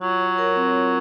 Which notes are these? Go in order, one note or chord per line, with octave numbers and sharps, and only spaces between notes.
F#3 F4
C#5
A#4
C4
F4